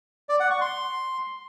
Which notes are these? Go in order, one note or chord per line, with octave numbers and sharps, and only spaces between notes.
D5
F#5
C#6
C6